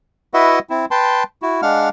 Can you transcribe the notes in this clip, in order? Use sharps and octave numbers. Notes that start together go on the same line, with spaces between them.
E4 F#4 B4 D#5 E5 F#5
C4 E4
B4 G5 A5 C6
E4 F#4
G#3 D4 F5 F#5 F6